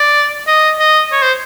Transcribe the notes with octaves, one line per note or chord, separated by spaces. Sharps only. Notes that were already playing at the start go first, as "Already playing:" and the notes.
Already playing: D5
D#5
D#5
C#5
C5